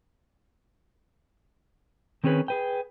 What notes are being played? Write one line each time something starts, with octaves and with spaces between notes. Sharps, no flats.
D#3 C4 C#4 G#4 B4
G#4 B4 G5